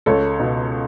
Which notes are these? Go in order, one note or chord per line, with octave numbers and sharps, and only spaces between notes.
C#2 A4 C#5
B2